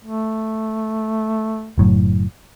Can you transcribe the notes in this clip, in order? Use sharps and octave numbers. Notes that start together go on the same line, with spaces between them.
A3
F#1 A2 F#3